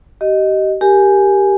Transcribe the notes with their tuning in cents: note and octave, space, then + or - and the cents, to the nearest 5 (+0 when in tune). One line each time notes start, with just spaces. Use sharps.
G4 -30 D#5 +0
G4 +0 A#4 +0 G#5 +0